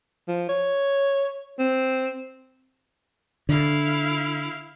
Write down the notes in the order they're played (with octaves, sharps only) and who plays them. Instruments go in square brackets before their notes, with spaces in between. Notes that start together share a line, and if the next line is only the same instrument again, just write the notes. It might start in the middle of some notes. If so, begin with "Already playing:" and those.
[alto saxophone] F3
C#5
C4
[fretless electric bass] D3 [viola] E4 F5